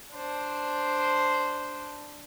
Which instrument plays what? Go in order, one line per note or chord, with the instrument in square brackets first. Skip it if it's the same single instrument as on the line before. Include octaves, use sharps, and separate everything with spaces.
[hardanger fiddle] D4 C5